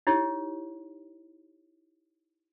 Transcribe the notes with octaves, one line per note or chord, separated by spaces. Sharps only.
D#4 E4 G4 C#5